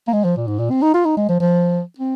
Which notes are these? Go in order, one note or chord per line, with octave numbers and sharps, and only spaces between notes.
A#3
G#3
F3
A#2
G#2
A#2
C4
D#4
F4
D#4
G#3
F3
F3
C4